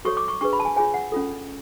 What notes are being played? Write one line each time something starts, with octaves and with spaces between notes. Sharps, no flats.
F#4 A4 C#5 C#6
D6
C#6
D4 G#4 B4 C#6
B5
A5
G#5
F4 G#4 C#5 G#5
F#5
C#4 F4 A4